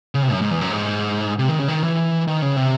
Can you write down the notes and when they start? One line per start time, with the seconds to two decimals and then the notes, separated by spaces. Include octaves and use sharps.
0.15 C#3
0.23 C3
0.32 F#2
0.41 G#2
0.51 E2
0.61 F#2
0.71 G#2
1.39 C3
1.49 D#3
1.60 C#3
1.68 D#3
1.83 E3
2.28 D#3
2.42 C#3
2.56 C3